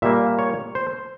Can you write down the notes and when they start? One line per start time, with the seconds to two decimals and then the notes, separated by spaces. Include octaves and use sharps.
0.02 A#2 G3 A#3 E5
0.39 C#5
0.75 C5